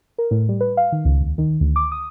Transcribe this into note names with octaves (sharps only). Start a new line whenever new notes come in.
A#4
A2
G3
B4
F5
D#3
C#2
D#2
D#3
D2
D6
D#6